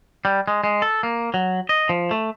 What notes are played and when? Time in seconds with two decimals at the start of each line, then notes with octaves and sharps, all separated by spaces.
0.25 G3
0.48 G#3
0.64 G#3
0.82 A4
1.03 A#3
1.34 F#3
1.69 D#5
1.89 F3
2.11 A3